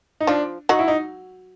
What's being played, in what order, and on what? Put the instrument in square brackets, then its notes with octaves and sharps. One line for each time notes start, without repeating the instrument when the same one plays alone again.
[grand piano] D#4
[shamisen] F3 F4 [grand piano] D4
[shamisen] F#3 F#4 [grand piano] D#4
[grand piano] E4
D#4